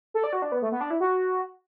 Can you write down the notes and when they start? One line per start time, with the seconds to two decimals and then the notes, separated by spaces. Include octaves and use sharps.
0.14 A4
0.24 D5
0.33 F#4
0.42 D4
0.52 B3
0.62 A3
0.72 B3
0.81 D4
0.90 E4
1.00 F#4